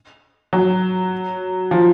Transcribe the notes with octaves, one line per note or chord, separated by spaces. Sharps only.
F#3
F3